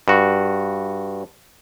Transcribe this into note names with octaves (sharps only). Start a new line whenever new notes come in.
G2 F#4